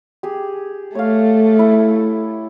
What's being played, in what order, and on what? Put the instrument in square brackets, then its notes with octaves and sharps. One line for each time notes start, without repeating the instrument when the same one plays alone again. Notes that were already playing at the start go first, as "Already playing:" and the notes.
[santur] G4 G#4
[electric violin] A3 [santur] C#5 F5
[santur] E4